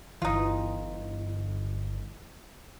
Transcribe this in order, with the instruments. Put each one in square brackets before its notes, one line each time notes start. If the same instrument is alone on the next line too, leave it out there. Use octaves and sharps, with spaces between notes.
[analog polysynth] G1 [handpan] E3 [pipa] D#4 F4